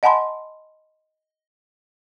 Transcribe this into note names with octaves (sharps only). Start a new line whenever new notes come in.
D#5 F#5 G#5 A5 B5 C6